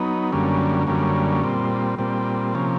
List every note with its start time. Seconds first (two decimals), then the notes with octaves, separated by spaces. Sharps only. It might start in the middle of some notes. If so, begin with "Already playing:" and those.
Already playing: F#3 B3 D#4
0.32 F#2 D3 G3 A#3 C#4
0.87 F#2 D3 G3 A#3 C#4
1.44 A#2 G3 C4
1.98 A#2 G3 C4
2.54 C3 F3 A#3 C#4